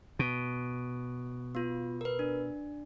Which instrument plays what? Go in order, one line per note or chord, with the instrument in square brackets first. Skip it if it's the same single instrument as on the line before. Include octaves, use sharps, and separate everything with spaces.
[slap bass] B2
[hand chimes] B3 F4
A#4 B4
D4